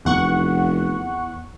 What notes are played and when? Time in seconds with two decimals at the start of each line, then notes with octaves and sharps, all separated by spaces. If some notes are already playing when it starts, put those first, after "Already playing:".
0.05 F1 E2 F#5 C#6